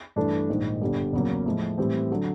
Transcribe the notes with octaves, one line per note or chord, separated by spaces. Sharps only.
G2 E3 A3 D4
A#1 G#2 D#3
G1 G2 D3 G3
E2 C#3 F#3 A#3
A2 F3 G#3
A2 E3 G3 C4
D3 F#3